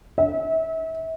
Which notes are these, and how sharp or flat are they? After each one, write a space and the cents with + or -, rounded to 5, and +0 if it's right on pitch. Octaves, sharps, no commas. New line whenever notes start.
E5 -35